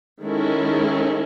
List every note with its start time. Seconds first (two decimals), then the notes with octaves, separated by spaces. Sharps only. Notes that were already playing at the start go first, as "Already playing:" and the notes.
0.22 D#3 G#3 C#4 E4 A4